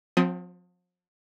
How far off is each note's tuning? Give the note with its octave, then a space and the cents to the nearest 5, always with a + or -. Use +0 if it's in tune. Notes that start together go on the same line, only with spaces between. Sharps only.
F3 +40 C4 -5 D#6 +25